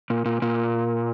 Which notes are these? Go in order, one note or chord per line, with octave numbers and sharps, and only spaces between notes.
A#2
A#2
A#2